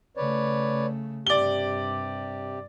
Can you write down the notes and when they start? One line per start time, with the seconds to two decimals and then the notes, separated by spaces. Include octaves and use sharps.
0.17 C#3 A3 B4 C#5 D5
1.27 G2 C3 G4 D5 G7